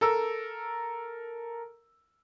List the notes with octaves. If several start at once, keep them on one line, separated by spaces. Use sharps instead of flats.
A4 A#4 E6